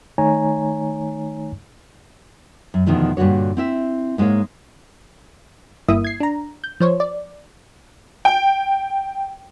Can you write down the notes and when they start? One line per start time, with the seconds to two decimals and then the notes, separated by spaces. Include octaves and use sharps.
0.18 D#3 A3 D#4 C#5 G#5 A#5
2.74 F#2
2.86 E2 B2 D3 D#3 F3 A3
3.17 G2 A#2 D3 F#4 C#5
3.57 C4 E4 E5
4.18 G#2 G#3 A#3 G#4 C#5 F5
5.88 G1 G2 A#3 E4 E5 D#6
6.04 G#6 C7
6.20 D4 A#5
6.64 G6
6.80 F3 C5 C#5
7.00 D5
8.25 G5